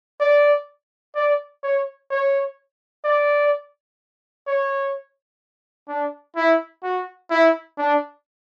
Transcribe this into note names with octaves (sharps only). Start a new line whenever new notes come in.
D5
D5
C#5
C#5
D5
C#5
D4
E4
F#4
E4
D4